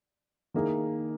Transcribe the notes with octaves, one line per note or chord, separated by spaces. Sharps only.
D#3 A#3 E4 G#4